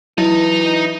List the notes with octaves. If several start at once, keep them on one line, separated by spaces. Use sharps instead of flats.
E3 F#3 D#4 E4 D#5